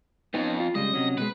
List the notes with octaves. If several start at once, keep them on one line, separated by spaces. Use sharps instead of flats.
F2 B3 C#4 D#4
F4
C#3 G3 G#3 D#5
C3 F#3 C#4
B2 F#3 G#3 B4